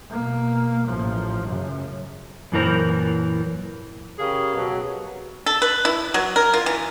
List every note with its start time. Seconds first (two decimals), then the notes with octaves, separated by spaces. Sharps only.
0.11 B2 A#3
0.88 A1 F3
1.46 F#2 C#3
2.52 F#2 A#2 E3 A#3 A#4 C5
4.19 C#3 G4 G#4 A#4 C#5 F5
4.55 B2 F#3
5.46 A4
5.62 B4
5.85 E4
6.14 F#3
6.36 A#4
6.54 F4
6.66 E3